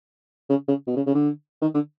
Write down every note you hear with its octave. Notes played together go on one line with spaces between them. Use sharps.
C#3
C#3
B2
C#3
C#3
D3
D#3
D3